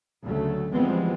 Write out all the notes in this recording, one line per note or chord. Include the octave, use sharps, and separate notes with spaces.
D2 C#3 F#3 A3
E3 F3 G3 G#3 B3 C4